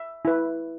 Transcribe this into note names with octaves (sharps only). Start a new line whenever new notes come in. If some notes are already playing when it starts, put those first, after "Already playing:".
Already playing: E5
E4 B4